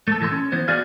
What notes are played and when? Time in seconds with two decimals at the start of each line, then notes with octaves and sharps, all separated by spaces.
0.08 A3 A4
0.20 A2 E3 A4 C6
0.32 C#4
0.52 E3 B3 C5
0.68 B3 F#4 G#4 D5 F5